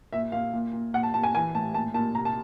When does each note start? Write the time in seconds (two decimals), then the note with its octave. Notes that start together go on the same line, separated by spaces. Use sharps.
0.13 A#2 E5
0.32 A#2 F5
0.53 A#2
0.73 A#2
0.93 A#2 F#5
1.03 A5
1.13 A#2 A5
1.23 G#5
1.35 E3 G#5
1.55 A2 A5
1.74 A#2 A5
1.94 A#2 A5
2.15 C3 A#5
2.25 A5